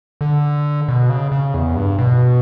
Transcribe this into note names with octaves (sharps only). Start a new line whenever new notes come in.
D3
B2
C#3
C#3
E2
G2
B2